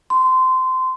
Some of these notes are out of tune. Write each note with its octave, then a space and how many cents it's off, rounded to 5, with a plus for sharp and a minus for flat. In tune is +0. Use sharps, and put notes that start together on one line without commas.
C6 -20